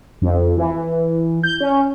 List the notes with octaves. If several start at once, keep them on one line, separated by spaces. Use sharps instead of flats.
F2
E3
G6
C#4